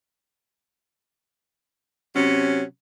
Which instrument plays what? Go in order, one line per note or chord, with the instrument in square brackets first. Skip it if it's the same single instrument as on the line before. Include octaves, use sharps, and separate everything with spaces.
[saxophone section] C3 F#3 C#4